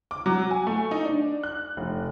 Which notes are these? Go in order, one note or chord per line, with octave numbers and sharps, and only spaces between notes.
D6
F#3
G#5
A3
D#4
D4
F#6
F1